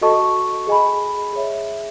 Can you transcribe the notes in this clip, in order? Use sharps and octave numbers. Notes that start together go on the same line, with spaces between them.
F#4 A4 D#5 A5 C#6
G#4 D#5 G#5 B5
G#4 C#5 E5